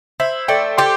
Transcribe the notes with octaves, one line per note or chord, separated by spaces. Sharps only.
E4 C5 E5
A3 D5 G5
G4 G5 C6